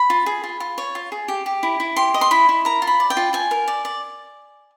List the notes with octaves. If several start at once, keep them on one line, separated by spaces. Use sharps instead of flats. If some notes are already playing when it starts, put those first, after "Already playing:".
Already playing: B5
F4
G#4
F4
F4
C#5
F4
G#4
G4
G4
E4
E4
G4 C6
D#5
C6
E4 B5
E4
A#4 A#5
F4
B5
D5
G5
F4
F4 G#5
A#4
D5
D5